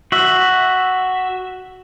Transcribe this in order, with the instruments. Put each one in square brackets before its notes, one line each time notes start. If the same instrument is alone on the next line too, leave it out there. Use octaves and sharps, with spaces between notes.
[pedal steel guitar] F#4 E5